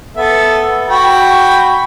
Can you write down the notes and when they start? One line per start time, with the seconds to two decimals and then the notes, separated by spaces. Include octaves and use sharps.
0.17 B3 A4 E5
0.89 F#4 G5 B5